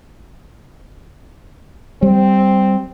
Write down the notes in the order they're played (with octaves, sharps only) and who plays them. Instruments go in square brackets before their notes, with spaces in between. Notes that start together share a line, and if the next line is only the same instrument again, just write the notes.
[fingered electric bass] G3 [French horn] C4